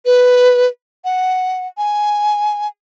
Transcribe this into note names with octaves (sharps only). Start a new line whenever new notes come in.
B4
F#5
G#5